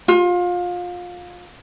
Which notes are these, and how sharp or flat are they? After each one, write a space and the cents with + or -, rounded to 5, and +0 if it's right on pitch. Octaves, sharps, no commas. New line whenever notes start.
F4 +25